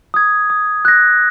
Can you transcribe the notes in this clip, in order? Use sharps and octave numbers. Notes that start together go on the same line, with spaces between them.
D#6 G#6
D#6
F#6 A#6